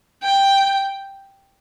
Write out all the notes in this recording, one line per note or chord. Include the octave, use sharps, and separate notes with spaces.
G5